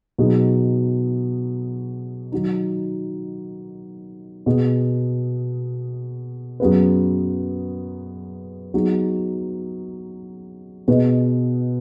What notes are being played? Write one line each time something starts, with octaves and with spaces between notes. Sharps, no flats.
B2 F#3 B3 D#4 G#4
D#3 F#3 D#4
B2 B3 G#4
F#2 F#3 B3 G#4 B4
F#3 B3 D#4 G#4
B2 B3 G#4 B4 D#5